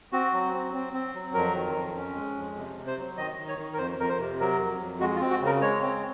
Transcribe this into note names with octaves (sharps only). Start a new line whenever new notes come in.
C4 F#4
F#3
C4
C4
C4
F#3
F2 A#4
D#3
F2
C#4
G#3
F2
C3
C3
C5
F#3
D#3 D#5
D#3
C#5
D#3
A#4
F2 C5
F2 A#4
C5
C3
F#3 A#4
F2
F2
G#3 F#4
F4
C4
F#4
C#3
A#4
G#3 C#5
C4